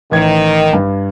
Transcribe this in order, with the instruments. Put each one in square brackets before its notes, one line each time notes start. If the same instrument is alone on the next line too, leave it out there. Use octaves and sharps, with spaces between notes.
[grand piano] A1 G#6 [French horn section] D#3
[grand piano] G2